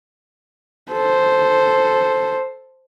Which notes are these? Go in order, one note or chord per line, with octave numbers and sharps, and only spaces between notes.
A4 C5